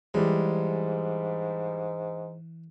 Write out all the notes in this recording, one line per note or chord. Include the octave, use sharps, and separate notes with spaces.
G#2 E3 G3 G#3